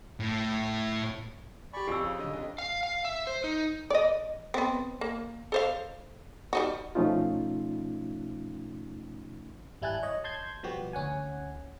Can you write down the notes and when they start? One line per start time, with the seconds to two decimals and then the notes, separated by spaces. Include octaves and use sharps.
0.20 A2
1.73 G4 D5 G#5 B5 C#6
1.87 F2 B2 F4 G4 E6 D7
2.01 C#3
2.17 B1 D3 D#5
2.33 F2 D4 D#5
2.58 F5
2.83 F5
3.05 E5
3.27 C5
3.44 D#4
3.90 D5 D#5
4.54 B3 C4
5.01 A#3
5.52 A4 C5 F5
6.53 G3 D#4 F#4
6.95 B2 F3 A3 C#4 D#4 F4
9.82 G#1 G3 E4 G#5 A5 F#6
10.03 C#5 D#5
10.24 A5 C6 G6 G#6
10.63 B2 F3 G3 B3 F#4 G4
10.93 D2 C#4 F#5 G#5